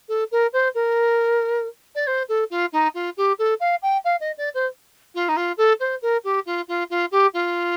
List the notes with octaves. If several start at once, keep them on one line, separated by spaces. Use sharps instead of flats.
A4
A#4
C5
A#4
D5
C5
A4
F4
D#4
F4
G4
A4
F5
G5
F5
D#5
D5
C5
F4
D#4
F4
A4
C5
A#4
G4
F4
F4
F4
G4
F4